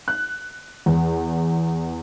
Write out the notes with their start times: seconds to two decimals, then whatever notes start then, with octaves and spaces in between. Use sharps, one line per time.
0.08 F#6
0.86 E2